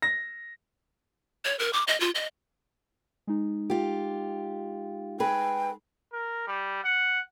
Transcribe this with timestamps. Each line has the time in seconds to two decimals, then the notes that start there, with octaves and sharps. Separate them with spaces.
0.02 A#6
1.45 C#5
1.59 A#4
1.73 D6
1.88 D#5
2.00 F4
2.15 D#5
3.27 G#3 D#4
3.70 F4 G4
5.20 G#4 B4 G5
6.13 A#4
6.47 G3
6.84 F#5